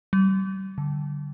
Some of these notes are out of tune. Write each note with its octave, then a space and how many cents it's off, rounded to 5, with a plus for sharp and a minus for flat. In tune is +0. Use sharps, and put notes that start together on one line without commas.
G3 -35
D3 -10